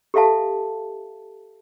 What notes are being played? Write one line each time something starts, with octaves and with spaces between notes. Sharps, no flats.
G4 A4 E5 F5 A5